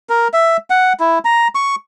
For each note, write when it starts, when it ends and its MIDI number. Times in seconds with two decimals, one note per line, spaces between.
0.09 0.28 70
0.33 0.57 76
0.70 0.93 78
1.00 1.19 64
1.25 1.48 82
1.55 1.75 85